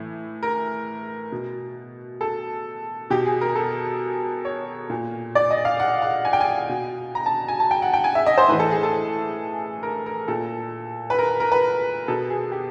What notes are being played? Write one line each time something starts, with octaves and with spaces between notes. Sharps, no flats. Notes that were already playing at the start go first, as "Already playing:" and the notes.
Already playing: A2 E3
A#4
B2
A4
B2 G4
G#4
A#4
A4
C#5
A#2
D5
D#5
F5
F#5
F#5
G#5
G5
G#5
B2
A#5
A5
G#5
A5
G5
F#5
G5
G#5
E5
D#5
C5
A2 E3 B4
A4
G#4
A4
A#4
A#4
A#2 A4
B4
A#4
A#4
B4
B2 A4
G#4
G4